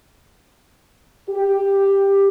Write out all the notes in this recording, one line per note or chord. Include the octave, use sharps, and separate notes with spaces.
G4